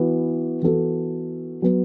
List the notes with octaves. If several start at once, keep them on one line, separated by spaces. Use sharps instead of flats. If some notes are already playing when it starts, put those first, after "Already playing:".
Already playing: E3 B3 F#4
E3 B3 F#4 A4
F#3 B3